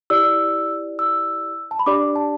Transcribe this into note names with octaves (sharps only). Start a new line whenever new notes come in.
E4 G4 D5 E6
E6
A5
B5
D4 G4 D5 D6
A5